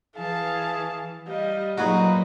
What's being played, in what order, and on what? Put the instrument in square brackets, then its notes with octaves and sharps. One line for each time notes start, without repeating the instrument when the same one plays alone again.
[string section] E3 [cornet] G#4 [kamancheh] F5 A5
[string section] G3 [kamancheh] D#5 [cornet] F5
[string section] A#2 F#3 [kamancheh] D#4 [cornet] F4 [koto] F#4 G#4 B4